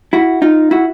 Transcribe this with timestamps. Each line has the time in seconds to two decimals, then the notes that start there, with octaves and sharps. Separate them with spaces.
0.13 E4 F#4
0.42 D#4 F4
0.71 E4 F#4